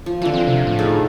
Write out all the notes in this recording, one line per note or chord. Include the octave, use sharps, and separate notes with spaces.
F3
D3 E3 F3
C4
C3
A2
D#4 G#4 A4